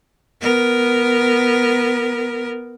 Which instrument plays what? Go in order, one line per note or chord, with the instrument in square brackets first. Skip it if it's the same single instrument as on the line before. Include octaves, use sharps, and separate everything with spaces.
[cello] B3 A#4